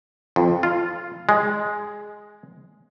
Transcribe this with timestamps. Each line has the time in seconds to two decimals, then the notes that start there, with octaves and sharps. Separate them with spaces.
0.36 F2
0.63 F4
1.29 G#3